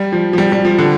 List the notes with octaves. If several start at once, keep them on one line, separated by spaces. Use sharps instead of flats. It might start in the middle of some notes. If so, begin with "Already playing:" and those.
Already playing: G3
F3
F3
G3
G3
F3
D3